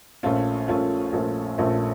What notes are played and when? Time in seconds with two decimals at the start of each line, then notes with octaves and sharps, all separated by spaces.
0.23 A#1 A#2 A3 C#4 F4
0.68 A#1 A#2 A3 C#4 F4
1.13 A#1 A#2 A3 C#4 F4
1.58 A#1 A#2 A3 C#4 F4